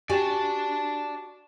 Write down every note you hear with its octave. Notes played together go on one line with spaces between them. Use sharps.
F#4 G4 D5 G#5 A5